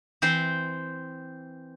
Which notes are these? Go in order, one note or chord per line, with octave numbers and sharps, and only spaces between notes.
E3 C4 C5